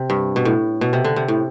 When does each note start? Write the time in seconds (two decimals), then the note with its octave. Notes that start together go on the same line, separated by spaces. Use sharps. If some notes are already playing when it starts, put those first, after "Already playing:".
Already playing: C3
0.10 G2
0.36 B2
0.45 A2
0.81 B2
0.93 C3
1.04 D3
1.16 C3
1.28 A2